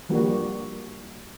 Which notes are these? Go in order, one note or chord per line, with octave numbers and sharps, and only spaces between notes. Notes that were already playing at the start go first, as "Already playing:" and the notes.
F3 G3 A#3 D4 F#4